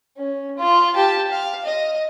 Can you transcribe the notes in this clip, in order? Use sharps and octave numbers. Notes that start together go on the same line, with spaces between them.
C#4
F4
G4 A5
F5
D#5